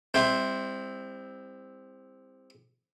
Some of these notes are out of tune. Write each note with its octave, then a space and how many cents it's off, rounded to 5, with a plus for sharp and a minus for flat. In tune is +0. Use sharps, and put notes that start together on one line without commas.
G3 +40 C4 +0 E4 -10